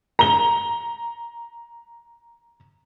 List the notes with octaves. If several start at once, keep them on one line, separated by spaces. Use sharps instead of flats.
A#5 G7